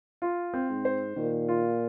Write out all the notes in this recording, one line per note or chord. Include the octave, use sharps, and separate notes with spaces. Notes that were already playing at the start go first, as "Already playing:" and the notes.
F4
C4
G#2
C5
A#2 D#3
F4